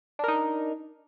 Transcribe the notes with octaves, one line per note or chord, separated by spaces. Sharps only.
D4 D#4 A#4